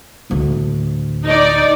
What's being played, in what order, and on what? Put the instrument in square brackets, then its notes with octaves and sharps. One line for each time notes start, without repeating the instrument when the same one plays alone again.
[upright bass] A1 D2
[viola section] D#4 D5